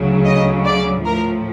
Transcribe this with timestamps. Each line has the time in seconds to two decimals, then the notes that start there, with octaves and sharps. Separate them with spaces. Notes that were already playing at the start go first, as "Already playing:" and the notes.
Already playing: D2 C#3 F#3
0.25 D#5
0.65 D5
1.05 A2 F3 A#4